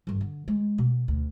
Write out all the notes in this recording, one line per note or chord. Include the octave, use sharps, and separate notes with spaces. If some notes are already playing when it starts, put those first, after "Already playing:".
G1 G2
D3
G#3
B2
D2